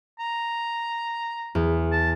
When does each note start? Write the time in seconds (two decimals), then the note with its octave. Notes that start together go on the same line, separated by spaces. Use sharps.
0.20 A#5
1.55 E2
1.92 A5